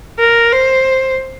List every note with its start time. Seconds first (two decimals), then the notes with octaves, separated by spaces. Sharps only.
0.19 A#4
0.52 C5